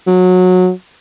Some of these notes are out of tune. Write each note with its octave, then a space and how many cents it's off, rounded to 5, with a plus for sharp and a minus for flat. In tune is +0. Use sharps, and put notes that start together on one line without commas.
F#3 -20